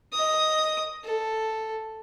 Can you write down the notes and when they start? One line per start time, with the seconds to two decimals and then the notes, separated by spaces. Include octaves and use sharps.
0.13 D#5 D#6
1.04 A4